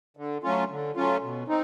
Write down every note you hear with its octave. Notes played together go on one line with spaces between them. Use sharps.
D3
F#3 A3 C#4 F4
D3
F#3 A3 C#4 F4
B2
C4 D#4